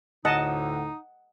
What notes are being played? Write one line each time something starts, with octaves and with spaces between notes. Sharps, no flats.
D2 A2 D3 D#4 D#5 F#5 A5